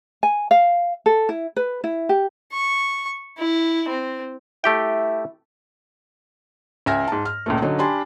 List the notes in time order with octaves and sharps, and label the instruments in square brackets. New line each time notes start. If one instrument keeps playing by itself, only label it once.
[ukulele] G#5
F5
A4
E4
B4
E4
G4
[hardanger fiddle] C#6
E4
C4
[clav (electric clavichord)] A3 G4 G5 [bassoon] E4
[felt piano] C#2 E5 G#5 F6 A#6
G#2 A5
F6
C#2 A#2 A3
D3 F#3 C#4 D#4
D4 G4 G#5 B5 C6